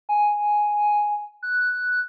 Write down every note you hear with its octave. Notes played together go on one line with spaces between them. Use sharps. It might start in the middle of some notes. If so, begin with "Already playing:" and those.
G#5
F#6